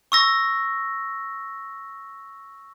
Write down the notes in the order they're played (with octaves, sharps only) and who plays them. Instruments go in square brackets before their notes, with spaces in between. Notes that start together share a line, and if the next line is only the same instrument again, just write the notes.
[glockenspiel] C#6 E6 A#6